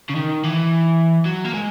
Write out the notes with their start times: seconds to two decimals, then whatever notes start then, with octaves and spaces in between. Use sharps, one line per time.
0.09 C#3
0.15 D#3
0.43 E3
1.26 F#3
1.45 A#3
1.54 G#3